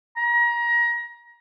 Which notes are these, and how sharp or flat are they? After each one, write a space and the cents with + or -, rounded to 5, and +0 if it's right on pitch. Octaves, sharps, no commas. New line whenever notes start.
A#5 +30